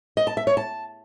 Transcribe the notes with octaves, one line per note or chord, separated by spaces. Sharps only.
D#5
A5
E5
C#5
A5